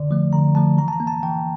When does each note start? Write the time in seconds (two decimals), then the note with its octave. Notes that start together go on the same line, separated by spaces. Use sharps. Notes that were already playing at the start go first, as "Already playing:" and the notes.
Already playing: D3 D5
0.11 F3 A3
0.33 D3 A#5
0.55 F3 A3 A5
0.77 E3 A#5
0.88 A5
0.93 A#5
1.00 A#3
1.07 A5
1.23 E3 G5